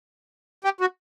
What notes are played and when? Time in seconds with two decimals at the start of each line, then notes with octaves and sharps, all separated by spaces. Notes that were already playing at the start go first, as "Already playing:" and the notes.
0.64 G4
0.81 F#4